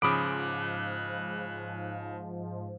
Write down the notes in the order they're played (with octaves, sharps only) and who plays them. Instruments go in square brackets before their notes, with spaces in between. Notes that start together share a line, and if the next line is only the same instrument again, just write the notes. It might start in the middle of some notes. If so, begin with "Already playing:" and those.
[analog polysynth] G#2 F3 [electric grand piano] C#3 B5 D7 [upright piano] D6 D#6 [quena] F#6